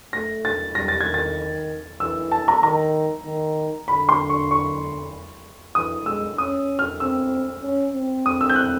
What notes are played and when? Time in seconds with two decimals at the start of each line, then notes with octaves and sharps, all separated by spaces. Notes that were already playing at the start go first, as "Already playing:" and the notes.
0.13 A3 A#6
0.45 A6
0.75 G3 A#6
0.88 A6
1.01 G#6
1.07 D#3
1.14 A6
2.00 E3 E6
2.31 A5
2.48 A#5
2.63 D#3 A#5
3.26 D#3
3.87 D3 B5
4.09 C6
4.30 C#6
4.51 C#6
5.75 E3 D#6
6.06 G#3 E6
6.38 C#4 D#6
6.79 F6
7.00 C4 E6
7.63 C#4
7.94 C4
8.26 D#6
8.41 E6
8.50 G6
8.56 F#6